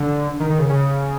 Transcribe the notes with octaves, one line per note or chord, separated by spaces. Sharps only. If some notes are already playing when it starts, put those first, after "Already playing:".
Already playing: D3
D#3
D#3
C#3
C#3